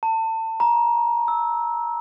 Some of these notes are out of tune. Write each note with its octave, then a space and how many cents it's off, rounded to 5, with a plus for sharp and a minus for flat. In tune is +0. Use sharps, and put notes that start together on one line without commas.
A5 +30
A#5 +25
E6 -15